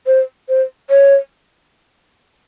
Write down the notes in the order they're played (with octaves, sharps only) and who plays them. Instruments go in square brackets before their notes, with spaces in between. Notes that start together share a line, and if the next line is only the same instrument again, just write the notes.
[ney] C5
C5
C#5